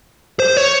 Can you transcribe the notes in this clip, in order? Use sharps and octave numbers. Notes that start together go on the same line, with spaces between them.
C5
C#5